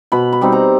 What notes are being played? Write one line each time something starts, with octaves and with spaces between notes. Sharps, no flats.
B2 B5
B5
G3 C4 D#4
A#5